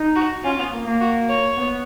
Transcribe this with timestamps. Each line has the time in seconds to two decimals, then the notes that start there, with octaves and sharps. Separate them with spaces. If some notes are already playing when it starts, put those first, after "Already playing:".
Already playing: D#4
0.16 F#4
0.44 C#4 F4
0.58 B3
0.72 A#3
0.86 A#3
1.01 F#4
1.29 C#5
1.57 B3